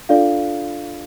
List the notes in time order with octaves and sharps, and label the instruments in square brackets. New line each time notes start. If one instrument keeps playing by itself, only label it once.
[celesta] D4 F4 A4 D5 F5